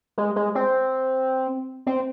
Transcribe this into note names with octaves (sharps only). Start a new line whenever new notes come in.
G#3
G#3
C4
C4